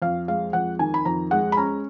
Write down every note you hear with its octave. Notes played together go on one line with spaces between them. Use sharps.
F2 F5
G#3 F5
F2 F#5
D#3 G#5
B5
F2 A#5
G#3 F#5
B5
C#4 A#5